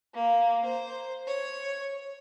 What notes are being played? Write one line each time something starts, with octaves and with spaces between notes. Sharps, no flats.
A#3
C5
C#5